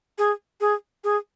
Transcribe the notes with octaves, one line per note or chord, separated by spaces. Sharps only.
G#4
G#4
G#4